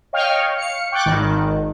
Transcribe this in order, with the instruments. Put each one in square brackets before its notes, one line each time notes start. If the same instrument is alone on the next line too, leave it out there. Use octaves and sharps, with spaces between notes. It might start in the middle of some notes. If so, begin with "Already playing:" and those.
[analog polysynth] C#5 D#5 F5 G5 C#6 F6
F5 C#7
G5 C#6 D6 F#6 G6 A6
G#1 D#3